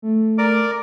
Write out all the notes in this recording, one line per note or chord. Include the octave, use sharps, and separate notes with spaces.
A3
A#4 D5 D6